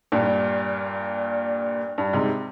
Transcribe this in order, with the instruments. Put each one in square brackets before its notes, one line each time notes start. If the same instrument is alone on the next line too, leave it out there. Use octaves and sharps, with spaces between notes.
[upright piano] G2 A#2
G2
G#2 C3